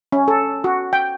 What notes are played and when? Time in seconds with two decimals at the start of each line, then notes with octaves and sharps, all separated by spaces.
0.12 C#4
0.28 A4
0.64 F#4
0.93 G5